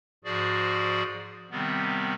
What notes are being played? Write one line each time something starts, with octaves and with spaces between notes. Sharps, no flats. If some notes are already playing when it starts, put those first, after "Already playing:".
G#2 F3 F#4 G#4 D5
C3 D#3 G3 B3 C4